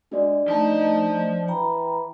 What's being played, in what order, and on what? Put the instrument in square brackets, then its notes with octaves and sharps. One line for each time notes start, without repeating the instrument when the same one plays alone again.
[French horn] G#3 [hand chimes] D4 F#4 D5
[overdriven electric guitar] F3 A5 [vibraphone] A3 D#5 [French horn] D#4
[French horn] E3 [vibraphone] G5 A#5 B5